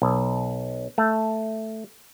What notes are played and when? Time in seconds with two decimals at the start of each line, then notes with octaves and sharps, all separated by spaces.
0.02 B1
0.98 A3